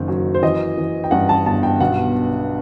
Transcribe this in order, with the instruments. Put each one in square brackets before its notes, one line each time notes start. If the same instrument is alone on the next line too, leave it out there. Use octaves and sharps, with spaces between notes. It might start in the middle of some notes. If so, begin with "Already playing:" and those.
Already playing: [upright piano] F#1 D#3
F#3
C5
E3 D#5
E3
G5
G2 F#5
A5
G1 A5
G5
B1 F#5